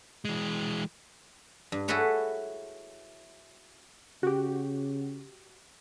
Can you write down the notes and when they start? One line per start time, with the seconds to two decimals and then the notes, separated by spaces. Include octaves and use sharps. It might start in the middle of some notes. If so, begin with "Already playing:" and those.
0.25 E3 G#3
1.72 G2
1.88 E4 F#4 G#4 A4 B4 C#5
4.23 C#3 F#4 G4